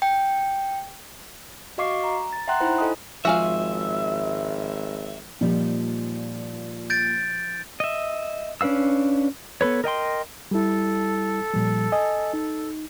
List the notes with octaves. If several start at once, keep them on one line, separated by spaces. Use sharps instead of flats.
G5
F#4 D#5 F5 C#6 D6 C7
A#5
A6
E5 F#5 G5 A#5 C6 F#6
D#4 E4 C5 B5
A4 D#5 G#5 D#6
G#1 F3 G#3 F4 F#4 G#4 E5 F5
A#2 F3 G3 D#4
G6 A6 D7
D#5 E5
C#4 D4 B4 F5 E6
B3 A4 B4 C#5
A#4 D#5 G5 C6
G3 E4 A4
A#2 F3 G3
D#5 G#5
D#4